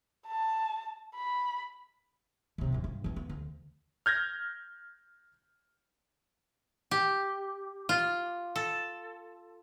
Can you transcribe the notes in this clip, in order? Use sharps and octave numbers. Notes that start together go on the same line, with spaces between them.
A5
B5
D#2 C3
D1 F#2
G2
E3 C4
B3
D2
F6 G6 G#6 A#6
G4
F4
A4